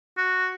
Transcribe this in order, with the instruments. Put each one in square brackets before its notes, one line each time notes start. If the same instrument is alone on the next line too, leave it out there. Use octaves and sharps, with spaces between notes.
[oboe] F#4